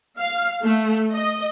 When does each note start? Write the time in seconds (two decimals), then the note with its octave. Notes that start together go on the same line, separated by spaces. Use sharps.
0.18 F5
0.62 A3
1.12 D#5